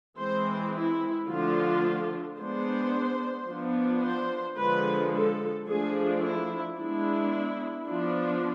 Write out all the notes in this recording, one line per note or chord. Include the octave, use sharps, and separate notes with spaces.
E3 G#3 C4 C5
E4
D3 F3 A3 D4 F4
G#3 B3 D4 C5
F3 B3 D4
C5
D3 F3 G#3 B4
A4
F3 A3 D4 G#4
E4
G#3 B3 D4 E4
F3 B3 D4